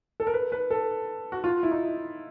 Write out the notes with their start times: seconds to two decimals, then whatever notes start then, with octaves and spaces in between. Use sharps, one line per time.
0.20 A4
0.27 A#4
0.34 B4
0.52 B4
0.70 A4
1.32 F#4
1.44 F4
1.63 E4
1.71 D#4